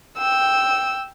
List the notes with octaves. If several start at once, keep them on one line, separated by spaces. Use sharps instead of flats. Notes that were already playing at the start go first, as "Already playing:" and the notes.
G5 E6